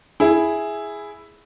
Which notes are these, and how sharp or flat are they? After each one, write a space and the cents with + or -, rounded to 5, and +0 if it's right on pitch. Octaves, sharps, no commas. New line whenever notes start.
E4 +0 G#4 +0